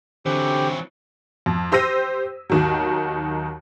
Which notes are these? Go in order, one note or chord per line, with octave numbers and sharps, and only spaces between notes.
D3 E3 F#3 C4 G4
F2
G4 C5 E6 A#6 D#7
D#2 D#3 F#3